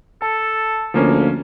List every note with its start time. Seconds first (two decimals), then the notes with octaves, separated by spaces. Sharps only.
0.22 A4 A5
0.94 D2 F3 A#3 C#4